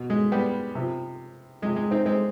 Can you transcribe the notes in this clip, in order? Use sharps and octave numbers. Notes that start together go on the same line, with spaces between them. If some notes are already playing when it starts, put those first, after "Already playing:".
Already playing: B2
G#3
G3 B3
C3 F3
C3 F3 G#3
G#3
C4 D#4
G#3 C4